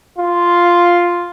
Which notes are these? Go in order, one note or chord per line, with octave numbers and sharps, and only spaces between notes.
F4